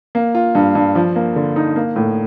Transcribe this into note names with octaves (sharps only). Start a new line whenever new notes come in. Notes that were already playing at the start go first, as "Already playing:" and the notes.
A#3
F4
G2
G2
F3
A#3
D3
D#4
A#3
A2